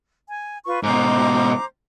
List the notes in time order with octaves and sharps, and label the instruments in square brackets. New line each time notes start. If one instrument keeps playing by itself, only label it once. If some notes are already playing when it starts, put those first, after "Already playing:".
[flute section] G#5
F4 B4 C#6
[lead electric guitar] G#2 B2 [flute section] C5 A#5 D6